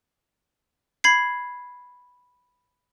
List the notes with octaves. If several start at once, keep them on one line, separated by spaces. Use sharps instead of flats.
B5 G#6 C7